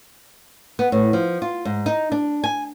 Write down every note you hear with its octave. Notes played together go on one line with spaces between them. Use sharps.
B3
A2
F3
F4
G#2
D#4
D4
G#5